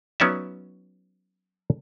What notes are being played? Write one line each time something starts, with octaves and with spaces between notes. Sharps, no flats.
F#3 B3 C#4 D#4 D5 E5